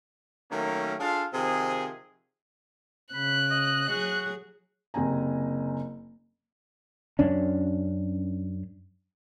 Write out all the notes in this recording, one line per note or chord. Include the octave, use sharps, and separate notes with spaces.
D#3 F#3 A3 A#3 C#4
D4 F4 G#4 A4 F5
C3 D#3 F3 G#4
C#3 B5 F#6
D#5
F#3 F#4 G#4
F#1 C3 C4 G#5 A#5
F#2 C#4 D4